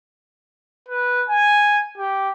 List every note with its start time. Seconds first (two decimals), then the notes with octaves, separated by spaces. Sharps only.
0.89 B4
1.29 G#5
1.98 G4